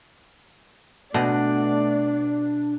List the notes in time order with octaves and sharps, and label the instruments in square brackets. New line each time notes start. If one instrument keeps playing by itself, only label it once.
[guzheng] B2 [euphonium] A3 [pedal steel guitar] D4 [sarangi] D5